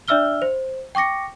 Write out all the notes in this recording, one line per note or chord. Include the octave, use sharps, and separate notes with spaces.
D4 D5 E5 E6 F6 G7
C5
G5 C#6 D6 A#6 C#7